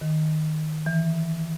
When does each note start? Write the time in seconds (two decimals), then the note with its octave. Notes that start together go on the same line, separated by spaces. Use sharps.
0.01 D#3
0.86 E3